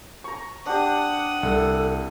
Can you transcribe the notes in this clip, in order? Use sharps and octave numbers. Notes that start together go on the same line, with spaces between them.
A#5 C#6
D4 G4 F#5 D#6
C2 A4